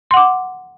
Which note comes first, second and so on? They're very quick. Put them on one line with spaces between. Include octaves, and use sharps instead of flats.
C6 F#5 D6